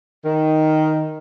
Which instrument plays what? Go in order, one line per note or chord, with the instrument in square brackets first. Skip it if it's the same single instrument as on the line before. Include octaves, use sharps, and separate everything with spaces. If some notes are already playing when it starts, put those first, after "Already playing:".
[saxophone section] D#3